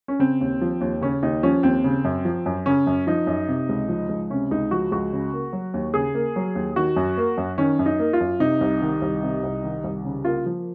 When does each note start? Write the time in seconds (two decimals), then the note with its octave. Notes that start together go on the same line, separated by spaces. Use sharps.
0.08 C#4
0.19 C#3 C4
0.41 D#2
0.61 F3
0.81 D#2
1.01 C#3 C#4
1.23 D#2 D#4
1.43 F3 C#4
1.63 D#2 C4
1.84 C#3
2.05 F#2
2.25 F3
2.46 F#2
2.66 C#3 C#4
2.87 F#2
3.07 F3 D#4
3.27 F#2
3.48 C3
3.69 C#2
3.89 F3
4.09 C#2
4.30 C3 C#4
4.51 C#2 D#4
4.71 F3 F#4
4.92 C#2 F#4
5.13 C#3
5.33 A#3
5.53 F#3
5.74 D#2
5.94 C#3 G#4
6.15 A#3
6.36 F#3
6.55 D#2
6.76 D#3 F#4
6.97 F#2
7.17 A#3
7.38 F#2
7.58 D#3 C#4
7.79 F#2
7.86 D#4
7.99 A#3
8.13 F4
8.21 F#2
8.40 C3 D#4
8.61 C2
8.82 D#3
9.02 C2
9.23 C3
9.43 C2
9.64 D#3
9.84 C2
10.05 C#3
10.25 A#3 F4
10.46 F3